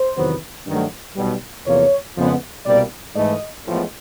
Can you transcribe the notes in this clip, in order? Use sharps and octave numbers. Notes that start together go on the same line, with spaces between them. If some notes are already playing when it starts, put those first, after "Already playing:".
Already playing: C5
E2 C3 D#3 F#3 B3
G2 D#3 F#3 A3
B1 B2 G3
E2 C3 F3 A#3 C#5
F2 C#3 F3 G#3 B3
C2 B2 G3 A#3 D5
G#2 E3 A3 D#5
A1 A2 F3 G#3 B3